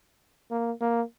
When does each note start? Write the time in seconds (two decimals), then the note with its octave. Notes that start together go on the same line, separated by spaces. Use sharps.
0.51 A#3
0.81 A#3